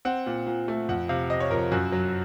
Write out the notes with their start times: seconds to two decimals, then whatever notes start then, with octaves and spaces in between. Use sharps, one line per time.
0.05 C4 F#5
0.26 A#2
0.46 A#2
0.68 A3
0.89 F2 F#5
1.09 C3 F5
1.30 C3 D#5
1.40 C#5
1.51 F2 A#4
1.72 F#2 F#4
1.92 F#3